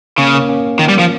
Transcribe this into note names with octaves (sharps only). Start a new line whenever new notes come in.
C#3 A#3 C#4
A#3 C#4
A#3 C#4
D#3
G3
F3